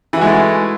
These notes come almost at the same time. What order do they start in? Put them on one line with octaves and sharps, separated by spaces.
E3 F#4 G#3 A3